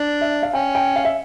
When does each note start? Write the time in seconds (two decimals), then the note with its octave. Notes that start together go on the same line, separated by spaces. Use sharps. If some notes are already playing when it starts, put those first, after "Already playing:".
Already playing: D4
0.21 E5
0.43 F5
0.53 C#4 G5
0.75 G5
0.96 F5
1.05 E5